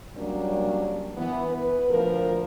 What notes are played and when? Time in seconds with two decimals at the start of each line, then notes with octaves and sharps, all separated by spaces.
0.16 F#3 G3 A#3 C#4 D4
1.17 E3 B3
1.51 B4
1.90 D2 A#2 F3 A#4